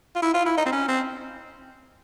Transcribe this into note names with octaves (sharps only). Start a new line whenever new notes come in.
F4
E4
F4
E4
D#4
C4
C#4
C4